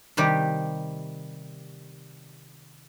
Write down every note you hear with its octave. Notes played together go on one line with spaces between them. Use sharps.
C3 D#3 G3 G4